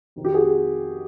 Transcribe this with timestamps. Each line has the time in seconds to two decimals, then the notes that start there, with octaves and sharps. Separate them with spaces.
0.16 F2 C3 D#3
0.25 F4 G4
0.34 F#4 G#4